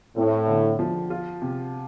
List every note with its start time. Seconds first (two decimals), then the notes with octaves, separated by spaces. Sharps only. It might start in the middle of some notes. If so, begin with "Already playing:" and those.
0.16 A2 C4
0.47 D3
0.79 F3
1.10 F4
1.42 C3